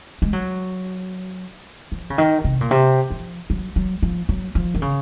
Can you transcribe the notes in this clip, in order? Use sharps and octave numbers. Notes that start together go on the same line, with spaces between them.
G#3
F#3
F3
C#3
D#3
C3
A#2
C3
F3
F#3
F#3
F3
F#3
F3
D#3
C#3